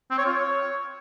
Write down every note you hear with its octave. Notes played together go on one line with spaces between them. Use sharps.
C4
C#5
F4
C#5